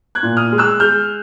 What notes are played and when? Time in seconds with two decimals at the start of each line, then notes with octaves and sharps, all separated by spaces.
0.15 F#6 G#6
0.23 A#2
0.37 D#6 F6
0.52 G#3
0.58 E6 F#6
0.80 G#3 F6 G6